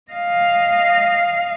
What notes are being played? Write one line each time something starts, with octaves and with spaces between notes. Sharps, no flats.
D#5 F5